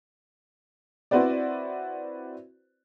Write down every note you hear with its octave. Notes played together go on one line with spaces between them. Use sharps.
C4 E4 F#4 B4 C5 D5